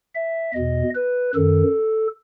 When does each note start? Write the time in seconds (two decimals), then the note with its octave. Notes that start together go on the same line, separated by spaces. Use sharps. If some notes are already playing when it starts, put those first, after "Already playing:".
0.15 E5
0.54 E2 B2 D#5
0.95 B4
1.35 F#2 D#3 A4